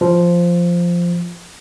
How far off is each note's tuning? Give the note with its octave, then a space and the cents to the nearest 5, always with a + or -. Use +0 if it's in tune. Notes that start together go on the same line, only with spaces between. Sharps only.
F3 -5